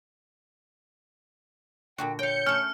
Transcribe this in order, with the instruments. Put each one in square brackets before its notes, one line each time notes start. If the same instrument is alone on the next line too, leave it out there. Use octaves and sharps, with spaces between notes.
[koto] A#2 D3 F#4 [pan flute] G5
[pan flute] C#5 [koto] F5 G5 [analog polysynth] G6 C#7
[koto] A3 C#4 [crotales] F6